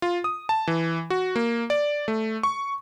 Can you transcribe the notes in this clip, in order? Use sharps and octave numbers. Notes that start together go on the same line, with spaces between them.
F4
D#6
A5
E3
F#4
A#3
D5
A3
C#6